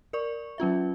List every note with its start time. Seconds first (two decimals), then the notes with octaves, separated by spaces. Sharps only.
0.13 A#4 D5 C#6
0.58 F#3 C#4 F4 E5